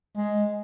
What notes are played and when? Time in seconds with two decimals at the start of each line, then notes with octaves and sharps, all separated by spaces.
0.17 G#3